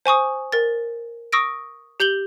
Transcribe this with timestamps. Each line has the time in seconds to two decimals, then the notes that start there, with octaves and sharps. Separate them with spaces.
0.06 C5 G#5 C#6 D#6
0.52 A#4 A6
1.32 C#6 D#6 E6 A#6 D7
2.00 G4 G6 F#7 G7